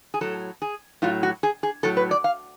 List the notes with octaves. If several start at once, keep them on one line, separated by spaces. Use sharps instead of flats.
G#4
A2 F#3 A4
G#4
A2 F#3 F4
F#4
G#4
G#4
A2 F#3 A4
B4
D5
F5